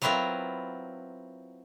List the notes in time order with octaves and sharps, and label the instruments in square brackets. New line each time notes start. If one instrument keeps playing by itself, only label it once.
[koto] F#3 B3 C4 E4 F4 A#4